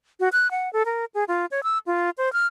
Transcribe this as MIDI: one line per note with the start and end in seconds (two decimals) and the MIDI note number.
0.20 0.29 66
0.33 0.50 90
0.51 0.71 78
0.73 0.83 69
0.86 1.05 70
1.14 1.24 68
1.28 1.46 65
1.51 1.63 73
1.63 1.78 88
1.86 2.10 65
2.18 2.32 72
2.33 2.46 89